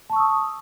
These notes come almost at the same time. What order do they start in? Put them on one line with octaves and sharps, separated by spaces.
A5 C#6 E6 D#6